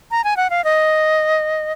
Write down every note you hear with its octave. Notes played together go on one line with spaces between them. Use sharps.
A#5
G#5
F#5
F5
D#5